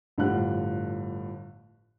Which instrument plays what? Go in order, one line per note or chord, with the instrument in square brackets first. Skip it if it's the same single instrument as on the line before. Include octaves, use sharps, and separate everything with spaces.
[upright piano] G1 A2 F3 G3 F#5 F#6